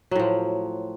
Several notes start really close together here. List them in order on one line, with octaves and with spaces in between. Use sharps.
F#3 A2 F3